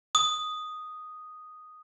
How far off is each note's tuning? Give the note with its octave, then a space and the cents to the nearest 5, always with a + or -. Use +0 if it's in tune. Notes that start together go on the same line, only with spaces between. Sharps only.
D#6 -5